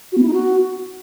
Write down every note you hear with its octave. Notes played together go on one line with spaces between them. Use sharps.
F#4
B3
E4
D#4
F#4